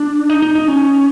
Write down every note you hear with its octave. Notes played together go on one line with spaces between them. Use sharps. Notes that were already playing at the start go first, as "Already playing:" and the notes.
Already playing: D4
D#4
D#4
D#4
C#4